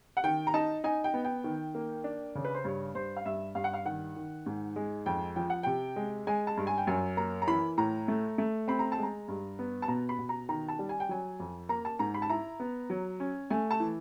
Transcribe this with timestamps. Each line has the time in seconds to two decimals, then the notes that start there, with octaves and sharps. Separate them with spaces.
0.17 F#5
0.24 D#3 G5
0.47 A#5
0.54 D#4 A5
0.84 D#4 G#5
1.04 G5
1.14 B3
1.24 G5
1.44 D#3
1.75 A#3
2.04 D4
2.35 C#3
2.45 B4
2.54 C5
2.64 G2 C#5
2.95 G2 C5
3.17 F5
3.25 G2 E5
3.55 G2 F5
3.64 F#5
3.73 F5
3.86 D#3 F#5
4.16 D#3
4.46 G#2
4.76 G#3
5.06 F2 G5
5.36 F3 G5
5.50 F#5
5.63 C3 G5
5.96 G#3
6.27 G#3 G#5
6.47 A5
6.57 G2
6.67 G#5
6.78 G5
6.87 F#2 G#5
7.17 A#3 A#5
7.42 A#5
7.48 E3 B5
7.78 A2 A#5
8.08 A3
8.38 A3
8.68 C4 B5
8.79 A#5
8.92 A5
8.98 G#3 A#5
9.28 G2
9.59 B3
9.82 A5
9.88 B2 A#5
10.09 B5
10.19 B2
10.29 A#5
10.49 D#3 A#5
10.68 A5
10.79 G3
10.89 G#5
11.00 G5
11.09 F#3 G#5
11.40 F2
11.69 A#3 A#5
11.85 A5
11.99 G#2 A#5
12.14 B5
12.22 A5
12.30 E4 A#5
12.60 B3
12.90 F#3
13.20 C#4
13.50 A3 G#5
13.71 A5
13.80 E3